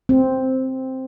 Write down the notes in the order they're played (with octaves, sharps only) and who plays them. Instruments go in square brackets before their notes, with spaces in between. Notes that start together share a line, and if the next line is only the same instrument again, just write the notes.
[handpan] C4